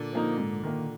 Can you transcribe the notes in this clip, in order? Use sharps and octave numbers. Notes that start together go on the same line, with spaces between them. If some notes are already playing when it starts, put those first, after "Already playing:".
Already playing: A#2 D3
F3 A#3 D#4
G#2
D#3 A#3